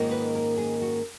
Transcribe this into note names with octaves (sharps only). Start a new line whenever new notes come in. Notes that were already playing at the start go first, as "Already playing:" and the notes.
Already playing: G#2 D#3 A#3 C#4 F4
B4
A#4
G#4
F#4